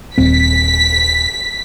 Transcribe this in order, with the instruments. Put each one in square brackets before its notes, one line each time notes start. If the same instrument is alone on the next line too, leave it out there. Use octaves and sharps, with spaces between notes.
[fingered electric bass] D#1 C4 [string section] B6